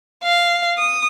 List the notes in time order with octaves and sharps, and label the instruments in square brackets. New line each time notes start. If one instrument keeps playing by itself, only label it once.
[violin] F5
D#6